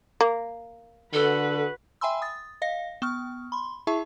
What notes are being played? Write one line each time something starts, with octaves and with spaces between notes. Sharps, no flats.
A#3
D3 F#4 A4 B4
E5 G5 G#5 B5 C6 E6
D#6 A6
D#5 F5 A#6
B3 C#6 F6
B5 C6
E4 G#4 E5 A5 C#6